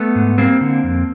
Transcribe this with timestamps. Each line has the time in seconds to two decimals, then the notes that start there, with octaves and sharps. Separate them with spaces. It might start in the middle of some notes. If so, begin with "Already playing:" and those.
Already playing: A3 B3
0.15 G#2
0.38 G3 A#3 C4
0.61 D3
0.83 F2